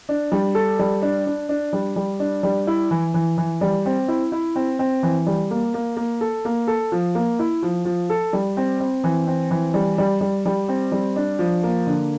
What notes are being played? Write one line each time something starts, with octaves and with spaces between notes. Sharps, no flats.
D4
G3
A4
G3
D4
D4
D4
G3
G3
D4
G3
E4
E3
E3
E3
G3
C4
E4
E4
C4
C4
E3
G3
A#3
A#3
A#3
A4
A#3
A4
F3
A#3
E4
F3
F3
A4
G3
C4
C4
E3
C4
E3
G3
G3
G3
G3
C4
G3
D4
F3
A#3
D3